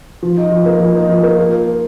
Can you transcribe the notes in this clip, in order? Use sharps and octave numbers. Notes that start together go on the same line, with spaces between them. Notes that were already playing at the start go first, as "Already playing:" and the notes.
F3
D#4
F3
A#3
F3
D#4
F3
A#3
F4